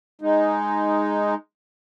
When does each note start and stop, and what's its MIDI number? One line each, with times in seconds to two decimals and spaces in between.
0.22 1.35 56
0.22 1.35 63